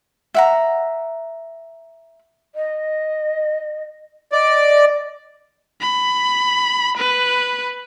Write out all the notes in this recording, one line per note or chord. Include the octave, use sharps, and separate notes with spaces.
E5 F#5 A#5
D#5
D5 D#5
B5
B4